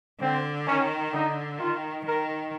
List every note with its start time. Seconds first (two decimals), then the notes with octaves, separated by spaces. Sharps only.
0.20 D3 C4
0.66 D#3 C#4
1.13 D3 D#4
1.59 D#3 F4
2.05 D#3 A#4